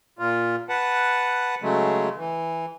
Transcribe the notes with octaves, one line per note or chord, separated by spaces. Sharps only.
A#2 F4
B4 F#5 A5
C#3 F#3 G#3 A3
E3